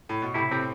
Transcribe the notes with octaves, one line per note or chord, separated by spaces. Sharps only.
A2
B2
A2 C3 E4
A2 C3 C4